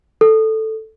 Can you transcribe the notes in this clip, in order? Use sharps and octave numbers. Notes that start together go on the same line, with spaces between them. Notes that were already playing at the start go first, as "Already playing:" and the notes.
A4